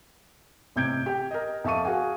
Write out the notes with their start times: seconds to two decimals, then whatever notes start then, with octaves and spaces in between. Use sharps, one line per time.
0.76 A1 C3 G6 G#6 D7
1.06 G4 G5
1.31 A#4 D#5
1.64 F2 E5 F5 A5 C#6 D#7
1.85 F#4 G#4 A#4 F5 F#5 G#5